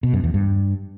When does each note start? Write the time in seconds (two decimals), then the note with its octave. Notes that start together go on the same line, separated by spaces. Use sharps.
0.03 B2
0.13 F#2
0.24 E2
0.34 G2